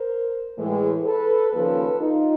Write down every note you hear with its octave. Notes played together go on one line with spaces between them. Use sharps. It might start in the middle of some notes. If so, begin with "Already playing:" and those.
Already playing: A#4 C5
A2 E3 G#3
A4 B4
D#2 C#3 F3 A4 B4
D#4 F4